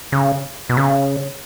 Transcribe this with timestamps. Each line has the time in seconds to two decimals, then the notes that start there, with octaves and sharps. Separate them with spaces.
0.12 C#3
0.69 B2
0.77 C#3